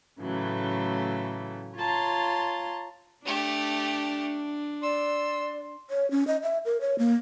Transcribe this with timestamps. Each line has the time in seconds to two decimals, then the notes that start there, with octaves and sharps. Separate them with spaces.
0.21 A2 C#3 E3 F#3 A3
1.77 F4 C#5 A5 A#5 C6
3.25 A3 D4 G4
4.83 D5 C6 E6
5.90 C#5
6.11 C#4
6.27 D#5
6.43 E5
6.65 A#4
6.81 C#5
6.99 A#3